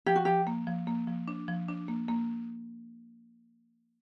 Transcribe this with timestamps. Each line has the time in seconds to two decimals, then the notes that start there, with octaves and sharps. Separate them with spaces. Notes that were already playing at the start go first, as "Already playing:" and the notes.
0.06 F3 G4
0.16 F#4
0.25 F3 G4
0.47 A#3
0.67 F3
0.87 A#3
1.07 F3
1.28 D4
1.48 F3
1.68 D4
1.88 A#3
2.08 A#3